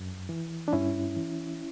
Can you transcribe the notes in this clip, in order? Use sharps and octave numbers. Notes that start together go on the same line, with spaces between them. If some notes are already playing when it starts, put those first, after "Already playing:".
Already playing: F#2
E3
D4
G2 C#4 E4
E3